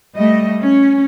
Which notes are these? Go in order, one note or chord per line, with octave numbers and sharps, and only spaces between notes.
G3 A3 D#5
C#4